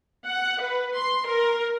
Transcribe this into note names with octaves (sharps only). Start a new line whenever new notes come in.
F#5
B4
C6
A#4